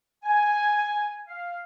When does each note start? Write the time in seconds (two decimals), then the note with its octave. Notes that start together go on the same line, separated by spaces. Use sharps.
0.24 G#5
1.28 F5